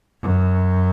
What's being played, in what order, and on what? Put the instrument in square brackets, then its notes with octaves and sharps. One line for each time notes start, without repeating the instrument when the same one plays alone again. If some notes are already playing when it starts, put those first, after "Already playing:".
[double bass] F#2